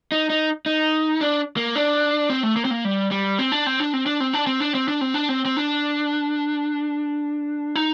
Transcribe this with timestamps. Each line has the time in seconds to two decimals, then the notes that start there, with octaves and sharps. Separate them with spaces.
0.12 D#4
0.30 D#4
0.66 D#4
1.21 D4
1.57 A#3
1.76 D4
2.30 C4
2.43 A3
2.56 A#3
2.65 C4
2.71 A#3
2.85 G3
3.11 G3
3.39 C4
3.52 D4
3.66 C4
3.80 D4
3.94 C4
4.06 D4
4.20 C4
4.34 D4
4.47 C4
4.60 D4
4.75 C4
4.88 D4
5.01 C4
5.14 D4
5.29 C4
5.45 C4
5.57 D4
7.76 D#4